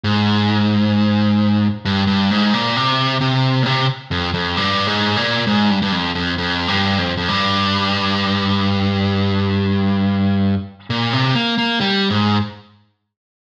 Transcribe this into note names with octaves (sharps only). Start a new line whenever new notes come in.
G#2
G2
G2
G#2
A#2
C3
C3
A#2
C3
F2
F2
G2
G#2
A#2
G#2
G2
G2
F2
F2
F2
G2
F2
F2
G2
A#2
C3
A#3
A#3
G3
G#2